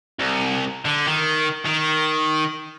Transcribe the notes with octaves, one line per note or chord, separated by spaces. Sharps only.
C2
D3
D#3
D#3